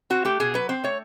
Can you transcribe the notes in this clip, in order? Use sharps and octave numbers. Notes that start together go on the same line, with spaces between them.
C4 F#4
A3 G4
B2 G#4
F#3 B4
C4 C5
A3 C#5